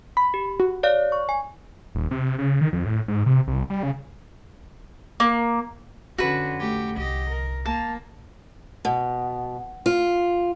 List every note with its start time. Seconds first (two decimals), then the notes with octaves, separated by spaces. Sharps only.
0.17 B5
0.34 G4
0.60 F#4
0.83 C#5 D5 F5
1.12 C#6
1.29 G#5
1.95 D#1
2.11 C3
2.38 C#3
2.61 D#3
2.72 F2
2.85 A2
3.08 G#2
3.26 C3
3.47 C2
3.70 G3
3.83 C#3
5.20 A#3
6.18 F2 D3 C#4 F#4 B4
6.60 A3 G4
6.97 C2 G4 D#5
7.30 A#4
7.66 A#3 A5
8.85 B2
9.86 F4